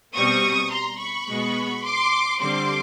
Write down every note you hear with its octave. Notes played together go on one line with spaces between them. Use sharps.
B2 G3 C4 C#6 D#6
A#5 C6
B5 C#6
B2 G#3 B3
C6 D6
D3 G3 C4 C6 D6